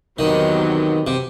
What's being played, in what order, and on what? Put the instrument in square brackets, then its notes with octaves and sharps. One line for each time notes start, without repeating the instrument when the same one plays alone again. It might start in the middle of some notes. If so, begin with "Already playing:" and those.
[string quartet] E2 C3 F#3 B3 [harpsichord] D#3
[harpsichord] C3